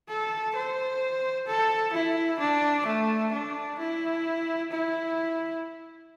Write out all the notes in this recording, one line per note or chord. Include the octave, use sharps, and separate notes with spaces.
A4
C5
A4
E4
D4
A3
D4
E4
E4